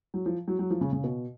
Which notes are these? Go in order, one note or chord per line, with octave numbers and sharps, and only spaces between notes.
F#3
F3
F#3
F#3
F3
C#3
C#3
B2